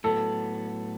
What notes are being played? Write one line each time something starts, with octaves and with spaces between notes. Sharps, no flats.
A2 F#3 B3 A4